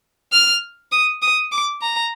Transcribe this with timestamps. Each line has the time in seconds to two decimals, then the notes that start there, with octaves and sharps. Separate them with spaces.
0.32 F6
0.92 D#6
1.22 D#6
1.52 D6
1.81 A#5